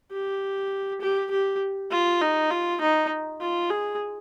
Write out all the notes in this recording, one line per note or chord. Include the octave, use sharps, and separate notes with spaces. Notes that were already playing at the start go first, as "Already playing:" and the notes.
G4
G4
G4
F4
D#4
F4
D#4
F4
G#4